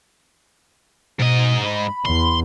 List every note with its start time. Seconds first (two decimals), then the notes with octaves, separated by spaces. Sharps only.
1.19 G#2 B2 D#5
1.65 B5
2.05 E2 C6